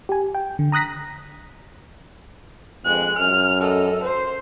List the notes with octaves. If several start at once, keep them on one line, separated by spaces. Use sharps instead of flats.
G4 G#5
G5
D3
A#5 D#6 F#6 A#6 B6
F2 G#3 F#6
F#2 F6
A4 D#5
C5 C6